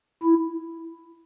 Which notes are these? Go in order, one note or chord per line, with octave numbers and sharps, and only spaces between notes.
E4